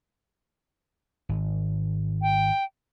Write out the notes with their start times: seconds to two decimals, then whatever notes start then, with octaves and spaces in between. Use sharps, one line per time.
1.29 G#1
2.22 G5